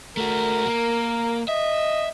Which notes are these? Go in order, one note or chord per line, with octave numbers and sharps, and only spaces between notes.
A3 F#4 A#4
A#3
D#5 E5